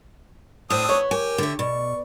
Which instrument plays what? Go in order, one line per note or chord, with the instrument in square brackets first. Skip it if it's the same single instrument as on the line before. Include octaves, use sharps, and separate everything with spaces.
[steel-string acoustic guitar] A2 C5 [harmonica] C4 D4 D#6
[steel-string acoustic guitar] B3 [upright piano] C#5 [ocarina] C#6
[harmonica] G4 [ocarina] A#4 [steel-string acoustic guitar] G#5
[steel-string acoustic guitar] D3 E5
[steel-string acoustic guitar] B2 [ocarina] D5 [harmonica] C#6